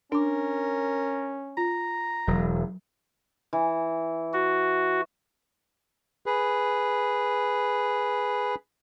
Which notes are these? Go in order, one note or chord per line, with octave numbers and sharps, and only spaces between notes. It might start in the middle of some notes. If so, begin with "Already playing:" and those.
C#4 D4 A#4 D6
F4 A#5
E1 F#3
E3
F#4
G#4 B4